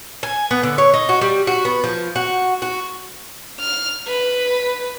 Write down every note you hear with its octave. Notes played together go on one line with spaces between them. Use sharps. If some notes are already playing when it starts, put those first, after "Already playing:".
G#5
B3
D3
C#5
D#4
F#4
G3
F#4
B3
F3
F#4
F#4
F6
B4